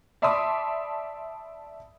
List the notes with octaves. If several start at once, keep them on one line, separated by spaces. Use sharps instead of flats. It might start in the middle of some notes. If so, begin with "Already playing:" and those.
D5 E5 A5 B5 C6 D#6